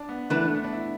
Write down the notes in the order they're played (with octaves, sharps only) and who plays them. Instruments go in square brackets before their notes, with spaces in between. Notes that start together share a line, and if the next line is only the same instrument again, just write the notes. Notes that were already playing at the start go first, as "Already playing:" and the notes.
Already playing: [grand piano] D4
B3
[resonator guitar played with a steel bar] E3 D4 B4 [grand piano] A3
[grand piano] A3
B3
D4
E4